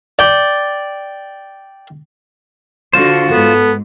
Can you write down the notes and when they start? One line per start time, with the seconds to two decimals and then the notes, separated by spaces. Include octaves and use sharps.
0.19 D5 G5
2.93 D3 F4 F#4 C5
3.32 G#2 B3 A4